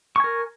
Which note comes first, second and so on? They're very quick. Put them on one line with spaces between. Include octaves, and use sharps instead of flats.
C#6 G#5 A#4